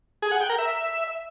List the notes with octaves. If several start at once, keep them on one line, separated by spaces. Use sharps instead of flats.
G#4
F#5
G5
A#4
E5